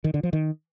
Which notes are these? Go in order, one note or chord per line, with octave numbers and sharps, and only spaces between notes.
D#3
D3
F3
D#3